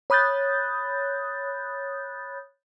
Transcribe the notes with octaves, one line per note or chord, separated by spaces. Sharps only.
C#5 B5 D#6 F#6 G6 A6